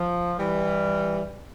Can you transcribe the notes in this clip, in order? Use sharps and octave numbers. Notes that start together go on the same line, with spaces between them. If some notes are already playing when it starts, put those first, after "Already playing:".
Already playing: F3
E3 G3